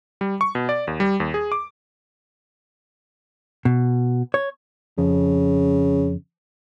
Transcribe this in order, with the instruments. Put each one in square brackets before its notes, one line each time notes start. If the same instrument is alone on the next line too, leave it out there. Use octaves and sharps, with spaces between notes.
[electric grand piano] G3
C#6
B2
D5
D#2
G3
D#2
G#4
D6
[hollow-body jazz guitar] B2
C#5
[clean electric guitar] F2 [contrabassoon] C#3